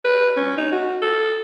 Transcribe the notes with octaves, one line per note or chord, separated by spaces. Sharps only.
B4
C#4
D#4
F#4
A4